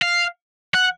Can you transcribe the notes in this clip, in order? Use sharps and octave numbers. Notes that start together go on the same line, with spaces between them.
F5
F#5